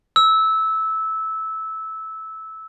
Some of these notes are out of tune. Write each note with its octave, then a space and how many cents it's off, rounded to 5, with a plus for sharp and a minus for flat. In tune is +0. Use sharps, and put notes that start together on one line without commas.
E6 -15